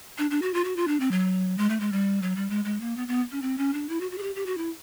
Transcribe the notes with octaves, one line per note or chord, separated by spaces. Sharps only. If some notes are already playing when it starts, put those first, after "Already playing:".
D4
D4
F#4
F4
F#4
F4
D4
C4
F#3
G#3
A3
G#3
G3
F#3
G3
G#3
G#3
A#3
B3
B3
C#4
C4
C#4
D4
E4
F#4
F#4
G#4
G4
G4
F#4
E4